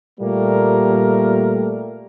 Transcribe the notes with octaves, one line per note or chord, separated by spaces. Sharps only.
A#2 G3 A3 A#3 A#4